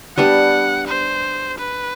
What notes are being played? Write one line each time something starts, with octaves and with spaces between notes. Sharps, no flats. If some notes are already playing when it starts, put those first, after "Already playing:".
G3 B3 D4 G4 F#5
C5
B4